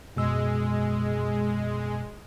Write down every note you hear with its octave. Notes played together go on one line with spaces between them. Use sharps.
F#2 B2 G#3 E6